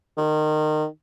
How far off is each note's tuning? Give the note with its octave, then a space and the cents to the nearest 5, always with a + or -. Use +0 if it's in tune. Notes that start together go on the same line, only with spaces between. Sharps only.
D#3 -25